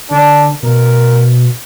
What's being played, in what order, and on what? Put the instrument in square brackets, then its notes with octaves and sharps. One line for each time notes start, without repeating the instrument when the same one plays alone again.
[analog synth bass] D3 [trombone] D4
[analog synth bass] B2 [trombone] A#4